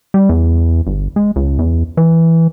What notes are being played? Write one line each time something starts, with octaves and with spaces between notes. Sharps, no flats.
G3
E2
G1
G#3
C#2
E2
E3